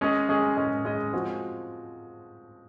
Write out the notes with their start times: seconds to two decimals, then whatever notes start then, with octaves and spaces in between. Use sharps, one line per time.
0.01 G#3 C#4 G#4 D#5
0.29 G#3 C#4 G#4 D#5
0.57 G#3 C#4 G#4 D#5
0.85 G#3 C#4 G#4 D#5
1.13 F3 G#3 C4 F#4